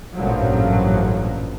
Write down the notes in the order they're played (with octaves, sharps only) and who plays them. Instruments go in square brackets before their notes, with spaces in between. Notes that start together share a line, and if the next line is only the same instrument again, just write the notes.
[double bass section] A1 G2 A#2 F3 F#3